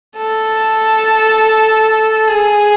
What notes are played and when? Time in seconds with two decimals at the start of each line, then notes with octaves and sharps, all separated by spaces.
0.18 A4
2.28 G#4